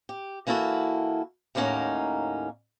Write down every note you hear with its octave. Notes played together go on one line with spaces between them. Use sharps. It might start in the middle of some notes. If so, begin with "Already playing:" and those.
G4
E3 A#3 E4 F#4 A4
D#2 A2 A#3 C#4 D#4 F#5